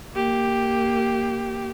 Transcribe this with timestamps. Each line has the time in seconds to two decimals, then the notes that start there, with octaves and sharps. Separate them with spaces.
0.15 A#3 G4